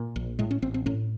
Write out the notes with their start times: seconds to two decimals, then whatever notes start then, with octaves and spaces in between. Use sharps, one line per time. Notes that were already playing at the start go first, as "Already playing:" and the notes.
Already playing: A#2
0.16 A#1
0.39 A2 G#3
0.51 C#4
0.62 A1 C4
0.74 C4
0.86 A2 C#4